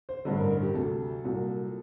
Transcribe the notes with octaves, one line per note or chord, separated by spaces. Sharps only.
C5
A1 G2 D3 C5
A#4
A#4
G4
D2 C3 F#3 A4
C2 A#2 F#3